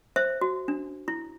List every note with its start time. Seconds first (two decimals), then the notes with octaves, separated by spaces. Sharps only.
0.16 C5 E5
0.41 F#4
0.68 D4
1.08 E4